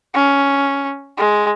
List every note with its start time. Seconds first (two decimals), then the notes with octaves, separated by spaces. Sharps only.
0.14 C#4
1.17 G#3